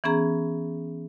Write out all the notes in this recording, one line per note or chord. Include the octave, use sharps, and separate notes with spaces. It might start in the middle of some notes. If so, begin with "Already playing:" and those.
E3 B3 C#4 G#4 A#5